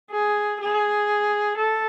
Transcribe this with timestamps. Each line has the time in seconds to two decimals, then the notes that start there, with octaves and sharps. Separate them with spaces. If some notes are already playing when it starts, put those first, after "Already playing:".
0.11 G#4
0.60 G#4
1.57 A4